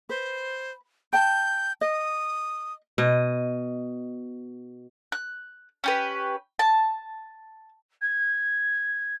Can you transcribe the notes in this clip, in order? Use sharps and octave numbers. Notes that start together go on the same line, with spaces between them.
B4 C5
G5 A5 G6
D#5 D#6
B2 D#5
F#6
C#4 G4 B4
A5
G#6